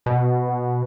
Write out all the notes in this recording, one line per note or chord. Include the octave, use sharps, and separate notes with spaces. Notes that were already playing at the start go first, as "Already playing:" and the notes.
B2